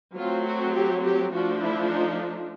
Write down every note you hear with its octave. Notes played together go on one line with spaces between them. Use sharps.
F#3 A3 C4 F4
F#4
G4
G4
F3 A3 D4 F#4
E4
D#4